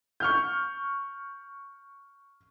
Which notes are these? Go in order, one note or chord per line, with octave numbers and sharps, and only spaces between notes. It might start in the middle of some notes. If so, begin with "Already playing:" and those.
C#6 F6 G6